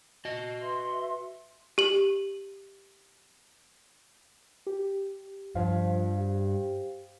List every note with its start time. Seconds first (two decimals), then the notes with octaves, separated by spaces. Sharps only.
0.25 F#4 D#5
0.60 B4 E5 C6
1.78 G4 F#7
4.67 G4
5.55 G2 F3 C5 F5
6.19 G4